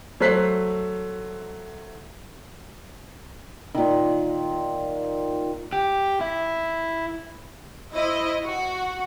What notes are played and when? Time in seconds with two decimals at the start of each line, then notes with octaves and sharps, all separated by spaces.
0.20 F#3 A3 C5 F#6 B6 C7
3.75 A#2 D#3
5.73 G4
6.21 E4
7.93 E4 C5 D#5
8.43 F#4